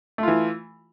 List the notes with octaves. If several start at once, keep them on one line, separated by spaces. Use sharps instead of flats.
E3 A3 F4